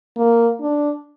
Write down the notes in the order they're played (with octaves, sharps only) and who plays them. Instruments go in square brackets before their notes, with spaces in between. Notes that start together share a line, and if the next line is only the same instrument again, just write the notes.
[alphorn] A#3
D4